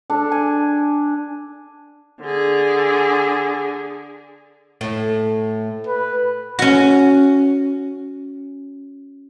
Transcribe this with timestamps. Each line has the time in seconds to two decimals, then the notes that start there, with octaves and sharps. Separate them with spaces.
0.10 D4 A4
0.31 G#5
2.22 D3 G#4
4.81 A2
5.87 B4
6.59 C#4 F#4